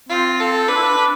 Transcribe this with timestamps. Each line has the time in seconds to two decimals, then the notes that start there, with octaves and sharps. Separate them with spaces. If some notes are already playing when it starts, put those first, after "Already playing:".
0.09 C4 F4
0.39 A4
0.68 D4 B4
0.76 E4
0.83 D4
0.98 D4